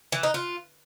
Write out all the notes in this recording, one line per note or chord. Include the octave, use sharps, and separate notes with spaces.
E3
D#4
F4